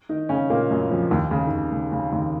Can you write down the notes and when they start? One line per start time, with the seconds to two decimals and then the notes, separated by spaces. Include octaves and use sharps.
0.09 D#3 D#4
0.29 C#3 C#4
0.50 A#2 A#3
0.71 F#2 F#3
0.90 F2 F3
1.11 D#2 D#3
1.31 C#3
1.47 D#3
1.51 C#3
1.72 C#3
1.92 C#3
2.11 D#2 D#3